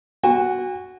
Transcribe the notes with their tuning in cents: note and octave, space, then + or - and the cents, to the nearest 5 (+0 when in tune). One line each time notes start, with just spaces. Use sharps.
F#4 +0 G#5 -40